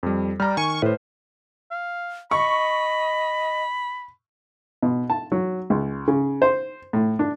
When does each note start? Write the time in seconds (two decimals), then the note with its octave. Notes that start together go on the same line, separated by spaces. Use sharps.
0.03 F2 G3
0.40 G3 A#5 F6
0.57 D#3 G#5 C#6 D#7
0.82 A2 B4 C5
1.71 F5
2.31 D#5 B5 C#6
4.83 B2
5.10 A5
5.32 F#3
5.70 C#2
6.08 C#3
6.42 C5
6.93 A2
7.19 D4